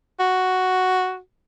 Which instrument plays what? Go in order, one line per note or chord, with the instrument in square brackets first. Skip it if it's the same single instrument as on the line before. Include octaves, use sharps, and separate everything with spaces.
[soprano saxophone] F#4